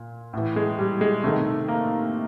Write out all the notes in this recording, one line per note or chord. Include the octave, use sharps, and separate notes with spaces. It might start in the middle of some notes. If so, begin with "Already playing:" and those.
Already playing: A#2
A2 E3
G#3
G3
G#3
C3 D#3 A3
A#3